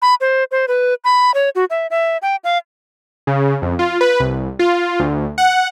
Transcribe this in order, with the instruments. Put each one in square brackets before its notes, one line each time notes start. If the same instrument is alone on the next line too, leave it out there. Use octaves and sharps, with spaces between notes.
[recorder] B5
C5
C5
B4
B5
C#5
F#4
E5
E5
G5
F5
[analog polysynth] C#3
F2
F4
B4
C2
F4
D2
F#5